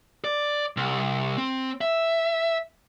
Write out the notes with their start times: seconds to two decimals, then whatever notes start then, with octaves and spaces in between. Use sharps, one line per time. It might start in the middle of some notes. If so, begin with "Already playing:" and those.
0.24 D5
0.77 C2
1.38 C4
1.81 E5